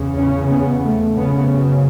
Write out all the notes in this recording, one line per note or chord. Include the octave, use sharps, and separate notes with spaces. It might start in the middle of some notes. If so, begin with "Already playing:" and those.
Already playing: E2 C#3
C#4
B3
A3
F#2 C#3 B3